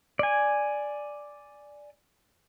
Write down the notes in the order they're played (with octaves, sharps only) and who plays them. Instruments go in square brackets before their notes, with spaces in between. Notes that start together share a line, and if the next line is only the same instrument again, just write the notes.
[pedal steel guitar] D5 G#5